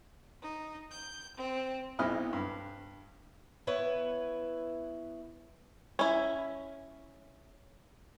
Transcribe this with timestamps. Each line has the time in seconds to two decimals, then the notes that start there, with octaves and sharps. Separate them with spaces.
0.42 D#4
0.92 G6
1.37 C4
1.99 B1 C4 E4 D#5 B5 F6
2.33 G2
3.67 B3 E4 B4 C#5
5.99 C#4 E4